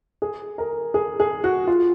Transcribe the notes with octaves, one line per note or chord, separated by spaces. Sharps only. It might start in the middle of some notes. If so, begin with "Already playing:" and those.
G#4
A#4
G#4
G#4
F#4
F4